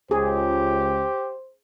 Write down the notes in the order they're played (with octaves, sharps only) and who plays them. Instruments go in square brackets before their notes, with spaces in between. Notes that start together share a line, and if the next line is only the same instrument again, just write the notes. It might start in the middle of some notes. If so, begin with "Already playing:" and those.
[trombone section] C#2 [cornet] G4 [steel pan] G#4 [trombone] C5